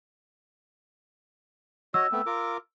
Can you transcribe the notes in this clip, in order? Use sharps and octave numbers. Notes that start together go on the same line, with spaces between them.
F#4 C#5 D#5 E6
A3 B3 C4
F4 A#4 D6